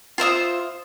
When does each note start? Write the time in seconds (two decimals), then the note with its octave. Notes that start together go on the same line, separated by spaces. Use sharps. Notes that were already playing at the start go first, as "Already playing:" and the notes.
0.18 F4 C5 E5 D#6